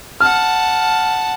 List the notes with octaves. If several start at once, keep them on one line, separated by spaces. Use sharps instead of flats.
F#5 A5 F6